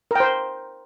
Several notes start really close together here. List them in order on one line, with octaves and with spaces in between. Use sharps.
A#4 G5 C5